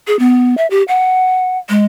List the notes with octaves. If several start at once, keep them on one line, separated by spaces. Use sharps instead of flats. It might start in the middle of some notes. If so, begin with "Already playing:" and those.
G#4
B3
E5
G4
F#5
G#3